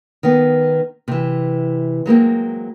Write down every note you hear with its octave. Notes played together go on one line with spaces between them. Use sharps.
D#3 B3
C3 E3
F#3 G#3 A#3 C4